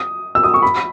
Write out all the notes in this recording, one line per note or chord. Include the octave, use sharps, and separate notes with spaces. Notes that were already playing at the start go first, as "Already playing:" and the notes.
Already playing: D#6
E6
D#6
C#6
B5